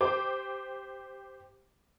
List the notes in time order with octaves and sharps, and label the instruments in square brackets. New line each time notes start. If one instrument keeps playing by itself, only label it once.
[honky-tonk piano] G4 C5 D6